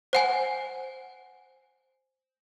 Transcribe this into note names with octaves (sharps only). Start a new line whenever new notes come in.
C5 F#5 G#5